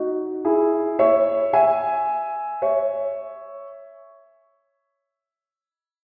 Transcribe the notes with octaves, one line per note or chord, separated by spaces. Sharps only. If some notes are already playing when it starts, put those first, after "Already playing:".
Already playing: D#4 F#4
E4 G#4
C#5 E5
E5 G#5
C#5 E5